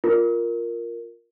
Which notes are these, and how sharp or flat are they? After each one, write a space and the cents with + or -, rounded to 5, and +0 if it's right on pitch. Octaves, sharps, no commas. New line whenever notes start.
F4 +0 A#4 +0